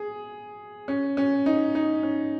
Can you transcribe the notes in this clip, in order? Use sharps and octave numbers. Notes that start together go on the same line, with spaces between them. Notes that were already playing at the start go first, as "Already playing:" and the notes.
Already playing: G#4
C#4
C#4
D#4
D#4
C#4